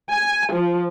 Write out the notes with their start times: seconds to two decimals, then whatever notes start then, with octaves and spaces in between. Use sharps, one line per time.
0.10 G#5
0.53 F3